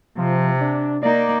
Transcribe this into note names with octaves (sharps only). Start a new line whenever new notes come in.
C3 F3
D4
A#3 D#4 D5